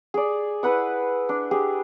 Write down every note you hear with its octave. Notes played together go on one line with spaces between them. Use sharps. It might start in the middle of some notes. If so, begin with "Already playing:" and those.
G#4 D5
E4 B4 F#5 D#6
D4
G4 G#4